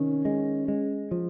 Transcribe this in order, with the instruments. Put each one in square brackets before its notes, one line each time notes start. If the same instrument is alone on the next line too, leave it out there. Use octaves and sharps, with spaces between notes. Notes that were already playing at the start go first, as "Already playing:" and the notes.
Already playing: [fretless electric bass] C3 D#3 [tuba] C#4
[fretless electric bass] G#3
G#3
F3